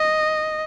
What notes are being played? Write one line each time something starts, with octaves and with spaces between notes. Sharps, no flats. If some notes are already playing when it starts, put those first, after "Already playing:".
Already playing: D#5